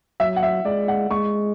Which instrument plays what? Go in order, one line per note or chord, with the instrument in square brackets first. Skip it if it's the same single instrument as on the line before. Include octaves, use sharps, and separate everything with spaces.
[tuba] F#3 [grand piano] E5
[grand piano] F#5
E5
[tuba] G#3 [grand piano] D5
[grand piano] F#5
[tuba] G#3 [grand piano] C#6